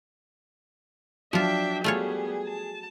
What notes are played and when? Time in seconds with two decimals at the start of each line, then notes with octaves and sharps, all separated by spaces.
1.33 F3 F#3 D4 F4 E5 G5
1.84 G3 A3 B3 F4 G#4 C#5
2.47 A5